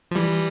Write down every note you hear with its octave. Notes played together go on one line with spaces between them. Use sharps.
F3
E3 G3